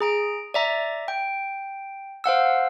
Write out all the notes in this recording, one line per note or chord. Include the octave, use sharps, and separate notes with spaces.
G#4 A#5 D7
D5 E5 A#5
G5
C5 F5 F#5 E6